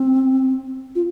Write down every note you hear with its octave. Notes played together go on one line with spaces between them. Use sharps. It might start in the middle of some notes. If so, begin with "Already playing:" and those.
Already playing: C4
F4